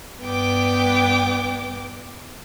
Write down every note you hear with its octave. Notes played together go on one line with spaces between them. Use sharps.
G2 B3 G5 D6